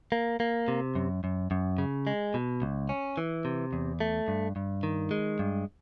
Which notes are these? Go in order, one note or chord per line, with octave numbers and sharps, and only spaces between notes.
A#3
A#3
C3
F#2
F#2
F#2
C#3
G#3
B2
C#2
C#4
E3
C3
E2
A3
G2
G2
D#3
G#3
G2